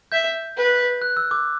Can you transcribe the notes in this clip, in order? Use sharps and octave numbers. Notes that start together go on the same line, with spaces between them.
E5 G6
B4
F#6
E6
D6